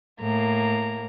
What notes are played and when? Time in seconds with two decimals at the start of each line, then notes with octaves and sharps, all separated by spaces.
0.21 A2 A#3 A#5